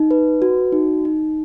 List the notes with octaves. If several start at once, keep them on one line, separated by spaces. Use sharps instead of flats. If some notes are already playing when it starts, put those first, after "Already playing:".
Already playing: D#4
B4
F#4
D#4
D#4